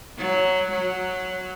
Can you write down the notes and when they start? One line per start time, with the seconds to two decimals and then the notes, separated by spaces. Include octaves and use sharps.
0.18 F#3
0.72 F#3